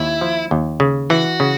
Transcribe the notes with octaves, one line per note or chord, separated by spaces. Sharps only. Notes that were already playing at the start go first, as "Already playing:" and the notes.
Already playing: D#2 E4
F3
D#2
C#3
E3 F#4
C#3